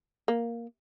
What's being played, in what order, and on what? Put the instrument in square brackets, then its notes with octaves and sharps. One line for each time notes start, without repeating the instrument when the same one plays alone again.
[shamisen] A#3